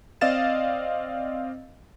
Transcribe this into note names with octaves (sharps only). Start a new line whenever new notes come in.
C4 D5 D#5 F5 A6 E7